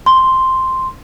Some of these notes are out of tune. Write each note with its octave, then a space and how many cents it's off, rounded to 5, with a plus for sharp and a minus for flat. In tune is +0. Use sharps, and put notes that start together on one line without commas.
C6 +0